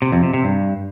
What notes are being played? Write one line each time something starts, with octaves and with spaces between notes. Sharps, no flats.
C3
F2
C3
C3
G2